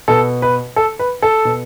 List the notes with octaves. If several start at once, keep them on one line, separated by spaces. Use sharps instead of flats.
B2 A4
B4
A4
B4
A4
B2